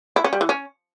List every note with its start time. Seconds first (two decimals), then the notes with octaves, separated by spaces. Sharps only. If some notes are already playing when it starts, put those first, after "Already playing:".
0.16 E4
0.24 C#4
0.33 G3
0.41 E3
0.49 C#4